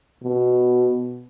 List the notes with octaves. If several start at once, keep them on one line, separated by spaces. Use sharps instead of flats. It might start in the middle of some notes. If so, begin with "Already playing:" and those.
B2